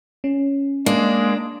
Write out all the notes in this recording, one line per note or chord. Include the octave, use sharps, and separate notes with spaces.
C#4
G#3 A#3 D4